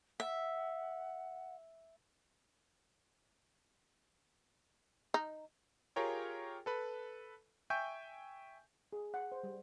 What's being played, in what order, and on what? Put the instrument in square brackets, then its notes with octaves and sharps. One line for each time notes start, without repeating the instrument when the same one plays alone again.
[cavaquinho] E5 [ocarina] F#5
[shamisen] D#4
[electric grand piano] F4 G4 G#4 A#4 C#5 G5
A4 B4 B5
E5 G5 G#5 C#6 G6
[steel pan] G#4
F#5
C5
G3